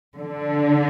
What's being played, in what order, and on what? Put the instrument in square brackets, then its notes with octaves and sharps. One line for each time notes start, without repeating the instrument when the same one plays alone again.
[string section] D3